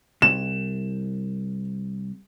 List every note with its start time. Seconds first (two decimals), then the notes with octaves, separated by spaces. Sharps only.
0.22 C2 E7